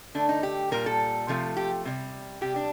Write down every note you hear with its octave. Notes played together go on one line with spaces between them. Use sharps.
D3 A3 D4
D#4
G4
A#2 G3 A#4
A4
C3 F3 A3
G4
C3 G3
C3 G3 G4
D4